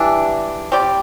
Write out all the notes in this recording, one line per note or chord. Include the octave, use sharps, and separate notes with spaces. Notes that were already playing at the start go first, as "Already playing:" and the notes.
Already playing: E3 G3 D4
G3 C4 G4 D5